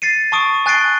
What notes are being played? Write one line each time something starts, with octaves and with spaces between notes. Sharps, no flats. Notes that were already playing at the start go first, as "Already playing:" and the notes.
A6 C7 C#7 D#7
A5 C#6 D#6 D7
G#5 F#6 A6 C7 D7 G7